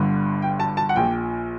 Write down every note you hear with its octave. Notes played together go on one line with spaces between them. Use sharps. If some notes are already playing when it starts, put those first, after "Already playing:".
Already playing: G1 G2 D3
G5
A5
A5
F#5
A#1 A#2 G5